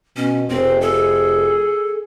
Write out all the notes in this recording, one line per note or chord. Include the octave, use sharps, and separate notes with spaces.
B2 C#4
F1 C4 G#4 C5
G#4 A4